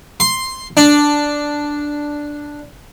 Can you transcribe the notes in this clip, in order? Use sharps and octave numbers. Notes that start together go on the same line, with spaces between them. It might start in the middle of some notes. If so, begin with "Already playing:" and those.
C6
D4